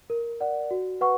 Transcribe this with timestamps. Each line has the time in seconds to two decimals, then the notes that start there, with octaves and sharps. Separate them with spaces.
0.10 A#4
0.41 D5 F#5
0.71 F#4
1.01 B4 F#5 C#6